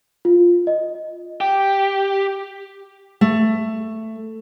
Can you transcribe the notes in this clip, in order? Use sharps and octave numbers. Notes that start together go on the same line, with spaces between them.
F4
D#5
G4
A3